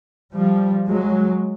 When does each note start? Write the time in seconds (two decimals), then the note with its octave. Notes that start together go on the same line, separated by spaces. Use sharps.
0.33 F3 G3
0.87 F#3 G#3